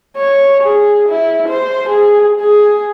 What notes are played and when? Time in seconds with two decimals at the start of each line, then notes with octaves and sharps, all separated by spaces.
0.17 C#5
0.63 G#4
1.08 E4
1.48 C5
1.89 G#4
2.41 G#4